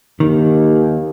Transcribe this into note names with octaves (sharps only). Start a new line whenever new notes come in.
D#2 D#3